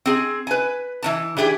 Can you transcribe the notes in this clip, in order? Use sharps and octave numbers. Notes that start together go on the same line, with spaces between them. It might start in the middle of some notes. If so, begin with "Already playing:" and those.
C4 G#4
B4 G#5
E3 C#4 A5
E3 D4 G4 G#4